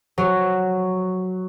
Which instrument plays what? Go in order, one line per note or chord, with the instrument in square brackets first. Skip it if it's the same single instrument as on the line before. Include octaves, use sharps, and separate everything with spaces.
[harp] F#3